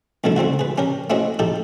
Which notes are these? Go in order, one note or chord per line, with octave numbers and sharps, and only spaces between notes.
C2 B2 D3 A3 E4
C#2 C4 E4 F#4
G#4 B4
C#4 G4 A#4
A3 C4 C#4 E4 F#4 D#5
D#4 E4 G4 A4